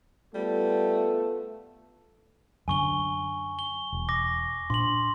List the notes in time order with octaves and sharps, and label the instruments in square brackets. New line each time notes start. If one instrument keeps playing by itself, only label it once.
[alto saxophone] G3 [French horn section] A3 B3 F4 [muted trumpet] A4
[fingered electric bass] F#2 D3 [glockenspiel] G#5 C#6 G7
[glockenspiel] G7
[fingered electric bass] E1
[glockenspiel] D6 A#6
[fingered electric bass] A#2 D4 [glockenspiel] C6 F#7